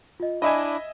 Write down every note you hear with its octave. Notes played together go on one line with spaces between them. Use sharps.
F4 D#5
D4 E4 D#5 E5 G#5 B5